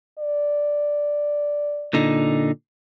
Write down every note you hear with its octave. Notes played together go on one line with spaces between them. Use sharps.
D5
A#2 D3 D#4